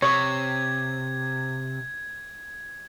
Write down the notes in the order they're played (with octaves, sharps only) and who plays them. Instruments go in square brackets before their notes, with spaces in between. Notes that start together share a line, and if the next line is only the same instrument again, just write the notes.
[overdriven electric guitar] C3 [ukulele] C#5 [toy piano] C#6 D#6 [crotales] G#6